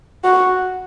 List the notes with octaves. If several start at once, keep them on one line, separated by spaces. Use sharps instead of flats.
F#4